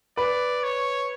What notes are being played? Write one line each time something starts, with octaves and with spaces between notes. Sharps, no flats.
B4 D5
C#5